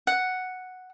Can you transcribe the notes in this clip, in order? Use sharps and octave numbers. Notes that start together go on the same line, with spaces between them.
F#5